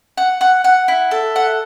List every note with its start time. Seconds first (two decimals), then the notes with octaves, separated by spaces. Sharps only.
0.17 F#5
0.41 F#5
0.64 F#5
0.88 E4
1.11 A4
1.36 F#5